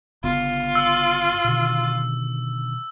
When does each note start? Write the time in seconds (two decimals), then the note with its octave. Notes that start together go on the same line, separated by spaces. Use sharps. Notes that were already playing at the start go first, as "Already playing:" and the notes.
0.24 G1 C#3 B3 F4
0.75 E6
1.44 B2 D3 D#3